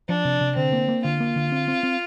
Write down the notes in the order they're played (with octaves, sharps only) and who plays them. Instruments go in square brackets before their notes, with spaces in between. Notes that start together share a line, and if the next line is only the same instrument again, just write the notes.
[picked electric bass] F3 [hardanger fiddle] D4
[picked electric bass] C3
C3
[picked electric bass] D3 [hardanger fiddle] C4
[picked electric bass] A#3
A#3
[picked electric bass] D3 [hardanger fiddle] F4
[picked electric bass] A#3
D3
C4
C4
C4